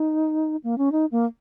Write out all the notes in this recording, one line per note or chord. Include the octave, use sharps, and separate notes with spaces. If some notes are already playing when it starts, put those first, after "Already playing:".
Already playing: D#4
A#3
C#4
D#4
A#3